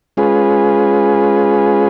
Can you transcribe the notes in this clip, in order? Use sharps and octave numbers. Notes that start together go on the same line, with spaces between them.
G#3 C#4 F4 G#4 B4